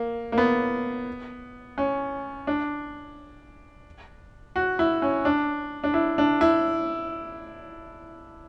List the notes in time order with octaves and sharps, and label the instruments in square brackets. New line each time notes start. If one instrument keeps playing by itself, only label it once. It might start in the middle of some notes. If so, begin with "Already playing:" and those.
Already playing: [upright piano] A#3
A#3
B3
C#4
D4
F#4
E4
C#4
D4
D4
E4
D4
E4